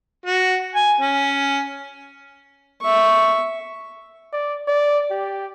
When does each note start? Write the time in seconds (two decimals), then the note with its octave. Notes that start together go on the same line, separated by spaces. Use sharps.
0.26 F#4
0.75 G#5
1.01 C#4
2.82 E5 C#6
4.33 D5
4.68 D5
5.11 G4